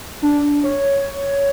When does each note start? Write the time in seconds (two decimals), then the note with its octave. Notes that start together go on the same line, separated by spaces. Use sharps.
0.22 D4
0.64 C#5